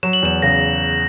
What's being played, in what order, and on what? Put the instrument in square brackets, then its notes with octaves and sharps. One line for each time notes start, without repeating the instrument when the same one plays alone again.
[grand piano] F#3 [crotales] E7
[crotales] F#7
[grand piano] E2 [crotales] E7
[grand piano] C#3 [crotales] A#6